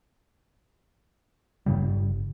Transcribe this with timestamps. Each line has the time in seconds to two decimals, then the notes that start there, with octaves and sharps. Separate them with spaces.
1.66 G1 G2 C#3 G3